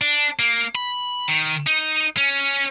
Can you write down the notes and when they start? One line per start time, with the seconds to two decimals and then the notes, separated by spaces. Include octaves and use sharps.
0.01 D4
0.39 A#3
0.75 B5
1.28 D#3
1.67 D#4
2.17 C#4